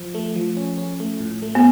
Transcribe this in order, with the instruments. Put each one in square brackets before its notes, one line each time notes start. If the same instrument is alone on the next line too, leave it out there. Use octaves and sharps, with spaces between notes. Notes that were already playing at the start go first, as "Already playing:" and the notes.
Already playing: [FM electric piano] F3
A3
F3
C#4
C#4
A3
A2
A3
[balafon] B3